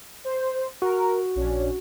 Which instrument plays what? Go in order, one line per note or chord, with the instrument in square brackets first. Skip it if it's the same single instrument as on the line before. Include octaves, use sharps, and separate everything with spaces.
[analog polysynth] C5
[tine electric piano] F#4 [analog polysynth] A#4
[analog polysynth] A#1 C#4 D4